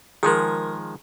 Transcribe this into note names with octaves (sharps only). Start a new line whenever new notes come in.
D#3 F3 G#3 G#4 A#4